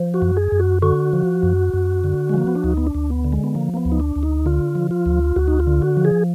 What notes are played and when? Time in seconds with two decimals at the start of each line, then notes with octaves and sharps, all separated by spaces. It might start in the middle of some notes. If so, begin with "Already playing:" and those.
Already playing: F3
0.14 F#4
0.22 F#2
0.37 G#4
0.52 F#2
0.59 F#4
0.82 D3 F#4
1.13 F3
1.43 F#2
1.74 F#2
2.04 D3
2.29 G#3
2.34 F3 A#3
2.47 B3
2.55 D4
2.64 D2 D#4
2.77 B3
2.87 D4
2.95 D2
3.10 B3
3.24 D3
3.32 G#3
3.44 B3
3.55 F3 A#3
3.74 A#3
3.77 B3
3.85 D2
3.92 D#4
4.00 D4
4.16 D2
4.23 D#4
4.46 D3 F4
4.75 F3
4.91 F4
5.06 D2
5.36 D2 F#4
5.48 D#4
5.60 F4
5.67 D3
5.82 F#4
5.97 F3
6.05 G#4